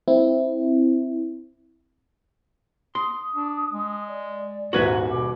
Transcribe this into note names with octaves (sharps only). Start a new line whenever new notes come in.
C4 E4
C6 D#6
D4
G#3
D5
D#1 G#2 F#4 B4 E5 G#6 F#7
B2 D6